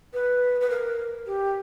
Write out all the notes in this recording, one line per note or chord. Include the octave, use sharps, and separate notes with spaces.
B4
B4
A#4
G4